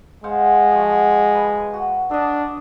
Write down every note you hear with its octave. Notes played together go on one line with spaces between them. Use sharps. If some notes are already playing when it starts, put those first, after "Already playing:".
G#3 C5 F5 F#5
F3 F#4
B4
F#4
D4 A4 D#5